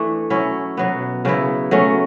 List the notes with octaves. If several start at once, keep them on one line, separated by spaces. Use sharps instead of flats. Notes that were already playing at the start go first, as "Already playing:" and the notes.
Already playing: E3 A3 D4
F#3 C#4 E4
B2 F#3 B3
C#3 F#3 B3 E4
F#3 A3 C#4